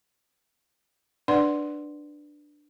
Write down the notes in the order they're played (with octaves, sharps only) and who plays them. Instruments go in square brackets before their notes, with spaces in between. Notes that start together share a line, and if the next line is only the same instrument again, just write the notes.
[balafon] D4 B4 D5 F#5 C6